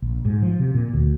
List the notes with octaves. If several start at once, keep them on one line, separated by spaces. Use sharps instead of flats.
A#1
G#2
F3
C3
A#2
D2